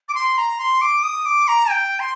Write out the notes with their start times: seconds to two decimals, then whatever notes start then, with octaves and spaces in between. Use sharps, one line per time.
0.09 D6
0.15 C6
0.38 A#5
0.59 C6
0.81 D6
1.03 D#6
1.25 D6
1.48 A#5
1.70 G5
2.00 C6